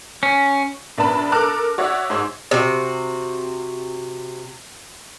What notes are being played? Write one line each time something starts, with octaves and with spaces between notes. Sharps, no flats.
C#4
A#1 B3 D4 A5 B5
A4 A#4 A5 D6 F6 F#6
F#4 C#5 D5 E5 F#5
G#2 C5 C#5 E6
C3 F#4